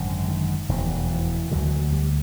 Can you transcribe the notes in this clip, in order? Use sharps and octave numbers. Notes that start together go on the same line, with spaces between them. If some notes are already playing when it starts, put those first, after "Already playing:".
Already playing: G#1 F#2 D3
D#3
F1 E2 B2 D#3
E3
D2 D3 F#3
G3